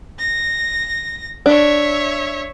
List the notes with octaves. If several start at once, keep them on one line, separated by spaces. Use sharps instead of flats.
A#6
D4 C#5 E5